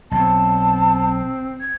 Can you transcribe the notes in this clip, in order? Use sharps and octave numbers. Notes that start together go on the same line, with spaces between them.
B1 B2 C4 A5
G#6